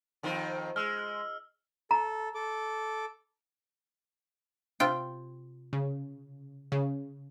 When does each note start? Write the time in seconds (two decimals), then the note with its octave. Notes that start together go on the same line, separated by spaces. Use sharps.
0.23 F2 D#3 C4
0.76 G#3 E6 F6
1.91 A4 A#5
2.35 A4 D6
4.80 C3 F4 G5
5.73 C#3
6.72 C#3